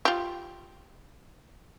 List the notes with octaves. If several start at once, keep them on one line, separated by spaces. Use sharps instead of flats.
F4 G4